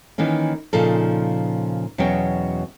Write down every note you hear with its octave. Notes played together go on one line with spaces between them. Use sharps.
D#3 E3 A#3 C#4
A#2 C#3 F3 D#4 A4
E2 B2 F#3 C#4 C#5 G5